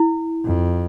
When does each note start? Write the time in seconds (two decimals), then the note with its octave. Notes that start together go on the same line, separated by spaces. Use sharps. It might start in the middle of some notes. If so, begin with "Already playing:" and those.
Already playing: E4
0.45 F2